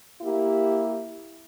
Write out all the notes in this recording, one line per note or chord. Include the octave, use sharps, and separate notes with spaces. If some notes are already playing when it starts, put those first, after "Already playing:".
A#3 E4 G4